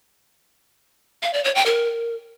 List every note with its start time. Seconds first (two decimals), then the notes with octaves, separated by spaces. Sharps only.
1.23 F5
1.33 D5
1.44 C#5
1.55 G5
1.66 A#4